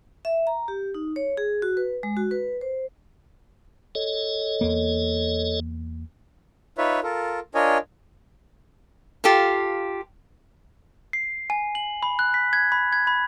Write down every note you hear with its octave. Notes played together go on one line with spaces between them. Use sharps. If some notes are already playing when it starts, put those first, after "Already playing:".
E5
A#5
G4
D#4
C#5
G#4
F#4
B4
G#3
F#4
B4
C5
A4 C#5 D#5
E2 A#3
D#4 F4 B4 C#5 E5
F4 A4 A#4
D4 F4 A#4 C#5 D#5 G#5
F4 G4 A4 F5
C7
G#5
F#7
B5
F#6
B6
G#6
B5
G#6
B5